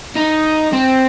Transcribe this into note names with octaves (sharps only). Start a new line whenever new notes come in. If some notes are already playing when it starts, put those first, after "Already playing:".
D#4
C4